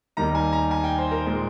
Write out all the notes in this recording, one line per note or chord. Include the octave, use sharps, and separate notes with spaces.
D#2 D#3 G3 A#3 A#5
G#5
A#5
G#5
G5
C5
A#4
A#2 G#3